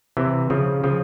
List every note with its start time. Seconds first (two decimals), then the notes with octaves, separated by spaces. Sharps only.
0.17 C3 E3
0.50 C#3 F3
0.84 C#3 F3